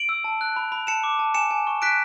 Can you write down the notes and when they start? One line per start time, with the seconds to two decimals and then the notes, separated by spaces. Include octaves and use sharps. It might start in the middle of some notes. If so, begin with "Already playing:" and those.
Already playing: D7 F#7
0.09 E6
0.24 A5
0.41 F#6
0.56 B5
0.72 B5
0.87 A5 C#7 E7
1.04 D6
1.19 A5
1.34 G#5 C#7 E7
1.51 G#5
1.67 C#6
1.82 F#6 B6 D7